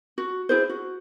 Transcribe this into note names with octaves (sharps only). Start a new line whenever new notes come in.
F#4
E4 G#4 C5
F#4